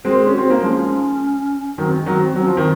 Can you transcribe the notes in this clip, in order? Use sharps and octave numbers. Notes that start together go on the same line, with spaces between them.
G#3 C4 F#4
A#4
G#4
C#4
C4 F#4
A#3 D#4
F3 G#3 C#4
D#3 F#3 C4
G#3
D#3 F#3
C4
F#3 C4
C#4
F3 C4
D#3